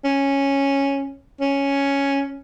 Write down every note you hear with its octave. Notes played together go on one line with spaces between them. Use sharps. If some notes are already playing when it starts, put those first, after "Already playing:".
C#4
C#4